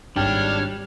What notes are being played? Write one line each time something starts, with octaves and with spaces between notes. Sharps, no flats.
G#1 G3 D4 C#5 G5 F6